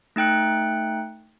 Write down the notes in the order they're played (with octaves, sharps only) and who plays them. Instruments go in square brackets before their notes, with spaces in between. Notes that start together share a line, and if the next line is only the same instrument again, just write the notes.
[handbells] A3 D#4 G5 F#6 C#7